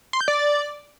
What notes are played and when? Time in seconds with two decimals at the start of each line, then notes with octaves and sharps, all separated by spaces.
0.13 C6
0.21 G6
0.28 D5